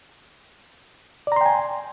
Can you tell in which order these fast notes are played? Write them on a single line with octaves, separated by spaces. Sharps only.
D5 A#5 C6 G5 G#5